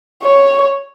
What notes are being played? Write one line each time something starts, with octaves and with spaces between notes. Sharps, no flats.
C#5